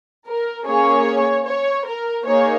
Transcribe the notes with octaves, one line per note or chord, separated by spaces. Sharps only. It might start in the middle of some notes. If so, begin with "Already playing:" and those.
A#4
A#3 C#4 G#4 C#5
C#5
A#4
A#3 D#4 G#4 C#5